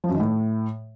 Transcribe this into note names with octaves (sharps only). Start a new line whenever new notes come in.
F3
F#2
D#3
A2